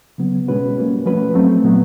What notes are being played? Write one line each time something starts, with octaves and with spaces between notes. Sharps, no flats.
C#3 F#3 B3
B2 G#3 C#4 F#4 B4
G3 A#3 C#4
F3 A3 C#4 F#4 B4
F#3 A3 C4
A#2 F#3 B3